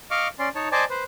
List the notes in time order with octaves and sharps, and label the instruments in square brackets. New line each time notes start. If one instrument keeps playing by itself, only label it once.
[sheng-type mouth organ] D#5 F5 C#6 D6 F6
C#4 D5 C6
D#4 C#5 A5
C5 D5 D#5 G#5 A5 D6
B4 C5